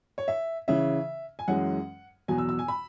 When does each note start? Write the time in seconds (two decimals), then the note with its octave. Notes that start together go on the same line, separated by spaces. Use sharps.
0.18 C#5
0.28 E5
0.68 C#3 E3 C#4 E5
1.39 G#5
1.48 F#2 E3 G#3 C#4 F#5
2.28 E2 B2 F#3 B3 G#5
2.38 E6
2.49 E6
2.59 G#5
2.68 B5